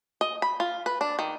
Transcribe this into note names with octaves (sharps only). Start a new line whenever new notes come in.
D#5
B5
F4
B4
D4
D#3